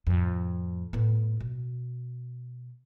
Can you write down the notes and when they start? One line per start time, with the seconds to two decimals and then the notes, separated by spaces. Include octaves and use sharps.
0.07 F2 A2
0.93 A2 B3
1.41 B2